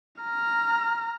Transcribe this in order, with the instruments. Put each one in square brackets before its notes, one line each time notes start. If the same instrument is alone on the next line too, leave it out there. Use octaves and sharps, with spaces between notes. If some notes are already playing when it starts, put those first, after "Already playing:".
[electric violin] A#5 F6